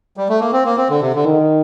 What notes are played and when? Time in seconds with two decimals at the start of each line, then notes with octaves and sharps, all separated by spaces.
0.17 G3
0.29 A3
0.40 A#3
0.53 C4
0.65 A#3
0.77 C4
0.90 D3
1.01 C3
1.14 D3
1.25 D#3